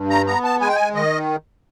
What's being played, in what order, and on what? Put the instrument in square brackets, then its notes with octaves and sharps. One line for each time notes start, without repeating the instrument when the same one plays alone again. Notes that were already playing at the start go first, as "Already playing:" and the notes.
Already playing: [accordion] G2
A#5
B3 A#5
A5
G#3 G#5
G5
G#5
D#3 D#5